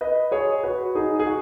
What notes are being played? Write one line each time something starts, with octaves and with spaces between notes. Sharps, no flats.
B4 D#5
G#4 C#5
F#4 B4
D#4 G#4
G#4
F#4